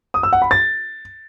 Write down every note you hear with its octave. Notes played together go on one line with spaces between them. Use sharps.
D#6
E6
F#5
B5
A6